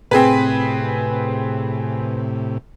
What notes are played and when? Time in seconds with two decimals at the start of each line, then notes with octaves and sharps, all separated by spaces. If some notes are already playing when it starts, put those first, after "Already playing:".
0.11 A2 C3 C4 G#4 B4